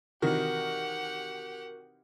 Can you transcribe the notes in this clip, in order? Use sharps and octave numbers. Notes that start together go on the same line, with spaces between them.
C3 D#3 E3 F#4 G4 A#4 F#5